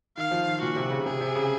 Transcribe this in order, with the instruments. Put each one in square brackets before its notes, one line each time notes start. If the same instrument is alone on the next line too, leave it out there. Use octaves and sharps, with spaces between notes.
[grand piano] D#3 [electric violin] F5
[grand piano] F3
D#3
[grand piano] A#2 [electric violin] F#4
[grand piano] C3
C#3
[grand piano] C3 [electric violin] G#4
[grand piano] C3
C#3